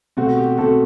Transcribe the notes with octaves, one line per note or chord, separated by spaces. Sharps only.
B2 A3 C4 F#4
G4
B2 A3 C4 F#4 A4